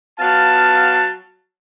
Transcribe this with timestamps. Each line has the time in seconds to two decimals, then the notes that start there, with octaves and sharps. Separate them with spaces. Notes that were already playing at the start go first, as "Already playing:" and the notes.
0.19 F#3 B3 F4 F5 A5